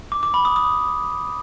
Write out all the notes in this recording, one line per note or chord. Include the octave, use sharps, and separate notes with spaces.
D6
D6
B5
D#6
D#6